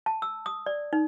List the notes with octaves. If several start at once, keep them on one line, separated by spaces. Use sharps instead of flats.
A5
E6
D#6
D5
D#4